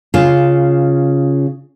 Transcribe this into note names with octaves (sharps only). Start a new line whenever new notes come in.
C#3 F4